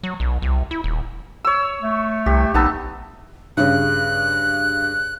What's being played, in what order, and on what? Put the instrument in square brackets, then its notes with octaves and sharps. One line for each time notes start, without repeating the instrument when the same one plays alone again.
[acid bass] F#3
B1
C2
E4
D#1
[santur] C#5 E6
[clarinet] A3
[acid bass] C2 [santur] G4
[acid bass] A#1 [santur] B3 A5 E6 [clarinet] D#4
[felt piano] G2 C#3 [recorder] F#6